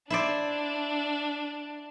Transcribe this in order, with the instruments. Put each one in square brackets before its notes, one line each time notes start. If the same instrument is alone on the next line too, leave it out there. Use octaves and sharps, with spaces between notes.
[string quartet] D4 [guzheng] E4 C5 D5